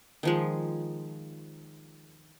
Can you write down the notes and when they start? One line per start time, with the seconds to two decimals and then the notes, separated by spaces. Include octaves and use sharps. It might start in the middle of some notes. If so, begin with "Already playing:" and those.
0.23 D#3 F3 G#3